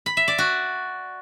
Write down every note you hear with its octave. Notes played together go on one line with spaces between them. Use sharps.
B5
E5
D5
F#4